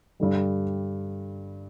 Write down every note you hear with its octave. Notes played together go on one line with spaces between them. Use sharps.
G2 D3 G3